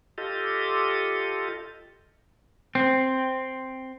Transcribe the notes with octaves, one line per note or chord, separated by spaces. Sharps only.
F4 G4 A4 D#5
C4